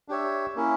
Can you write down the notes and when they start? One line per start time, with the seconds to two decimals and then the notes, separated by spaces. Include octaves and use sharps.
0.08 D4 G4 C#5 E5
0.56 A#3 C#4 E4